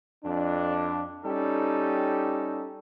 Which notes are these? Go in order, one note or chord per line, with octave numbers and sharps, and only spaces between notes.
F2 D4
G3 C#4 D#4 G4 A4